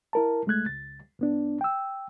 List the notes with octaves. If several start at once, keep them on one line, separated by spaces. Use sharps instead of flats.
E4 A#4 A5
C2 G#3 A3 F#6 G#6
C#2 A6
C2 B3 D4
G5 E6